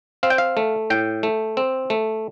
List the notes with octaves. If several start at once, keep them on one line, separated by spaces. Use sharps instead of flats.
C4 F5
G5
F5
A3
A2 G5
A3
C4
A3